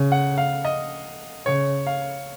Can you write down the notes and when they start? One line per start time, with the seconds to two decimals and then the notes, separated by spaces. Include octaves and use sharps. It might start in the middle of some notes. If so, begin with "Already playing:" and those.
Already playing: C#3
0.12 F#5
0.38 F5
0.65 D#5
1.45 C#3 C#5
1.87 F5